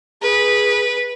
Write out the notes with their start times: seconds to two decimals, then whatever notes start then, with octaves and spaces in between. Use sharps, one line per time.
0.22 G#4 B4